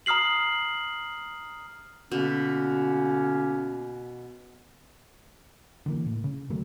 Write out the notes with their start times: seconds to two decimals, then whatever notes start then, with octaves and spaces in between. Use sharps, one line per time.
0.06 A#5 D#6 F6 C7 F#7
2.12 B2 D3 A#3 C#4
5.86 D3 E3 A#3
6.06 A2
6.24 C#3
6.49 G2 D#3 F#3 A3